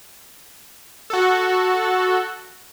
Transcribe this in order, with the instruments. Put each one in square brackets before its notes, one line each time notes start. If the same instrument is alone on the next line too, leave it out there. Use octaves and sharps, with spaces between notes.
[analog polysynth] F#4 A4